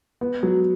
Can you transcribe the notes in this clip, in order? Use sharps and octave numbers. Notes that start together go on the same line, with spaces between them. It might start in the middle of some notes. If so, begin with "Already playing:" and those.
B3
F#3